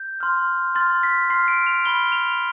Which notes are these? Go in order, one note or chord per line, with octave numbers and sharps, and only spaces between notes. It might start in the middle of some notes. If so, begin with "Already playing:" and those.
Already playing: G6
C6 F6
C6 F6 A6
B6
C6 F6 C7
D7
F7
B5 F6 G7
F7